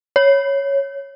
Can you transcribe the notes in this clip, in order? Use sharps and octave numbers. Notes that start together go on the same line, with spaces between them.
C#5